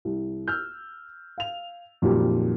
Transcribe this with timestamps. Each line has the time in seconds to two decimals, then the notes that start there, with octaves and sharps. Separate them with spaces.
0.05 C2
0.48 E6 F6 G6
1.38 F5 F7
2.02 F2 A#2 D#3 F#3 G3